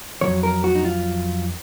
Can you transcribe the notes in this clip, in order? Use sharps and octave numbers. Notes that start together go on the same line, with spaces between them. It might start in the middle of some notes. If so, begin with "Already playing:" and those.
F2 D#3 F#3 C#5
A#4
F#4
D#4
F4